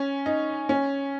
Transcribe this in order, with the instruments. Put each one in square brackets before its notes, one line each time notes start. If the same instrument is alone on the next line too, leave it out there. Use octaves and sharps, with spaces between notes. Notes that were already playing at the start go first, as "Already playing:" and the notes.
Already playing: [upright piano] C#4
D#4
C#4